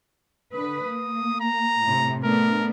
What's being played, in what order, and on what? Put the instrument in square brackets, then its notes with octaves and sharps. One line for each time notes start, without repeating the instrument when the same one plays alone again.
[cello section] D3 B4 [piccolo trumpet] D#6
[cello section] A#3
[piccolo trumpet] A#5
[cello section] A2 C3
[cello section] A3 B3 D4 [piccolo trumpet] A#4